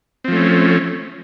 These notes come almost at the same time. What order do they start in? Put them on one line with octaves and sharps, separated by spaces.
C4 F3 A3 C#4